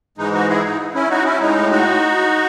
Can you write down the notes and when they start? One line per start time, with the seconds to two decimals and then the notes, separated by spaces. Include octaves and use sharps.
0.18 G#2 E3 G#3 D#4
0.33 D#4 F#4
0.49 E4 G#4
0.64 D#4
0.95 C#4 E4
1.10 D#4 F#4
1.25 C#4 E4
1.40 A2 G#3 D#4
1.71 D#4 F#4